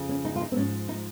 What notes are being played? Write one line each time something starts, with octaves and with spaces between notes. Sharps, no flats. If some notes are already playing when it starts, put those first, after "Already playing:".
Already playing: F2 C#3 F3
C#4
D#4
F4
D#4
C4
G#2 F3 C#4
D#4